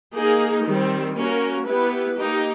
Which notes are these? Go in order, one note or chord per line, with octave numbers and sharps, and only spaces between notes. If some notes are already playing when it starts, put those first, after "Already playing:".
A#3 D#4 G#4
D#3 G3 C4
A#3 C#4 F#4 A#4
B3 E4 G4 B4
A#3 D#4 G4